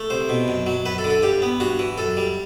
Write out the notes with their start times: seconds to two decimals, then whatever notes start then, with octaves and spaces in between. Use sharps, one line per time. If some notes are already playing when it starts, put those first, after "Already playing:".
Already playing: A3
0.10 C2 C5
0.29 B2
0.48 F#2
0.66 F#3
0.86 F#2 B4
0.98 A4
1.04 D3
1.10 A4
1.23 G2 G4
1.42 B3
1.60 G2 F#4
1.79 E3
1.98 F#2 A4
2.17 G3